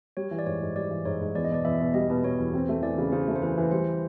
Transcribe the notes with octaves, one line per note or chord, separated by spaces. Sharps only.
G3 C#5
E3
D5
G#2 C#5
G#2
G3 D5
E3
G#2 C#5
G#2
E2 D5
D#5
B2 D5
E2 E5
B2
G3 D#5
B2
B2 C#5
E2
C4
A3
E3 D5
C#3
C#3 C5
A3
C5
E3 B4
E3
G3 C5